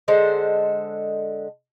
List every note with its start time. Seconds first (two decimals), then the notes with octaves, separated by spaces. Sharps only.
0.08 D3 G#3 A4 C5